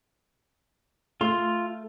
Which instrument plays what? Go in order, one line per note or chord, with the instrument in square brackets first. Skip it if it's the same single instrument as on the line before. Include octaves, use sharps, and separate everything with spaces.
[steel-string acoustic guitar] A3 [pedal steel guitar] F4 C6